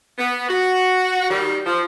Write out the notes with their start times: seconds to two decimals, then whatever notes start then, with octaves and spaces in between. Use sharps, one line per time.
0.18 B3
0.49 F#4
1.30 D#3 G3
1.66 F3